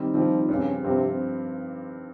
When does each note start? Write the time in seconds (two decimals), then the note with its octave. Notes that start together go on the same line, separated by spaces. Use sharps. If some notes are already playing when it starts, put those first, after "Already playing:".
Already playing: D#3 G3 C4
0.14 D#3 F3 G3 C4
0.49 G2 C#3 F3 C4 G4
0.84 G2 C3 F3 C4 G4